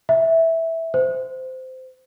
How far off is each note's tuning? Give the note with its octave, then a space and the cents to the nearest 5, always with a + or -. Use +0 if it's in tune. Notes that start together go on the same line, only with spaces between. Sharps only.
E5 -10
C5 -15